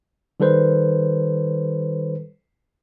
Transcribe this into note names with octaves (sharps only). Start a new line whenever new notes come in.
D#3 G3 A4 B4 C5